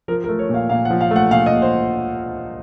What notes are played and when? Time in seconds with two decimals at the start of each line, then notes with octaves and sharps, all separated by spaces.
0.08 F3 A#4
0.24 A#4
0.29 A3
0.39 C#5
0.49 A#2
0.54 F5
0.69 A#2 F5
0.85 F#5
0.90 F3
1.01 F5
1.11 A3 F#5
1.31 A#2 F5
1.46 D#5
1.51 A#2
1.62 C5